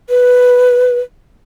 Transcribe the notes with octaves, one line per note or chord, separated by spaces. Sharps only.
B4